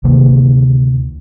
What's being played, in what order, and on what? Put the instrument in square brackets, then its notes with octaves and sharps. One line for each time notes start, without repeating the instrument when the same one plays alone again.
[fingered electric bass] D2 C3 D#3 A#3